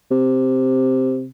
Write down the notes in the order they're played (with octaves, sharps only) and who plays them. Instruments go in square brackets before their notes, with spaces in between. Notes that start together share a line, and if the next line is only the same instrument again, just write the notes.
[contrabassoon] C3